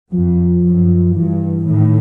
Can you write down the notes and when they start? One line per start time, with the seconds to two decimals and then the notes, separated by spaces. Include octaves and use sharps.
0.13 F2 F3
0.65 F#2
1.16 G2 E3
1.67 A2 D#3